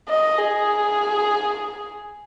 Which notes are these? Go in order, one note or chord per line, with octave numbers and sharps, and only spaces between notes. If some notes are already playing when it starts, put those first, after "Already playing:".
D#5
G#4